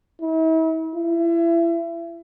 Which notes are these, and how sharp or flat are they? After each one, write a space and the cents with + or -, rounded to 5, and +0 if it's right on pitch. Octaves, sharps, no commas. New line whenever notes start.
E4 -40
E4 +30